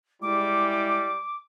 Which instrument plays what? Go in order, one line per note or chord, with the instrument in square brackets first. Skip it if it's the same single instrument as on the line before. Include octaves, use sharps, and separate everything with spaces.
[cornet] G3 [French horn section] G#3 E4 [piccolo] D6